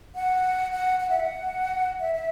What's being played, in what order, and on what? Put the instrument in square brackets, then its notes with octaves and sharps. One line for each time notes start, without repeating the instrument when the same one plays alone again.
[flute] F#5
F#5
F#5
E5
F#5
E5
E5